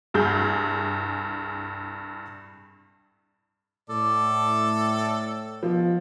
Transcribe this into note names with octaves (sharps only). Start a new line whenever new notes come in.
C2 G2 G#4 G6
A2 A4 D5
B2 F3